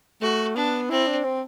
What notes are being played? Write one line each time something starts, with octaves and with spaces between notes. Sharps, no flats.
A3 F#4
B3 D4
C4 E4
D4
C4